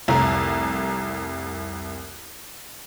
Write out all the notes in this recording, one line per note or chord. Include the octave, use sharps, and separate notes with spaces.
F1 C2 A#5